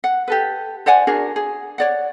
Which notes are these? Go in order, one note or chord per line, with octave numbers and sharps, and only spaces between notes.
F#5
G4 A4 B4
C5 D5 F#5 G#5
D4 F#4 G#4 A#4
G#4
C#5 D5 F#5